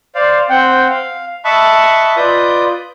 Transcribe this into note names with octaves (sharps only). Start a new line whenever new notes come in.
C5 D5 F5
C4 C5 F#5 G5
F5
D#5 E5 A5 B5 C#6 F#6
F4 B4 D5 D#5 D#6 G6